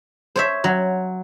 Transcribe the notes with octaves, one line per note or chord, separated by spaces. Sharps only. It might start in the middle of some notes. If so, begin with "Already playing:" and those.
C5 C#5 E5
F#3